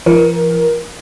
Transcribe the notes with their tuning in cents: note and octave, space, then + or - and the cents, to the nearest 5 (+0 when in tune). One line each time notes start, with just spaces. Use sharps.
F3 -45 A#4 +20